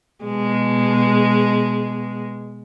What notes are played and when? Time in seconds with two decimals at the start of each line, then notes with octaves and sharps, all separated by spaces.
0.24 B2 G#3